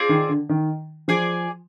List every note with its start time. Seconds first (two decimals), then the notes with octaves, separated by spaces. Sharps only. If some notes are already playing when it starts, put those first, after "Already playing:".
Already playing: C4 F4 G#4 D5
0.09 D#3
0.29 D3
0.49 D#3
1.08 F3 G#4 D5 G#5